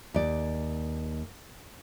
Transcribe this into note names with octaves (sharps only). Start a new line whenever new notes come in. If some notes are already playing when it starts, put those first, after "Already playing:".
D#2 D5